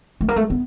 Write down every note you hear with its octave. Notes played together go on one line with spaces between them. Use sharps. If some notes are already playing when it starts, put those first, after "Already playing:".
A3
A#3
A3
B3